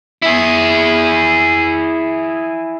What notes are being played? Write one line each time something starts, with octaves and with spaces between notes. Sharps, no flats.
E4 G#4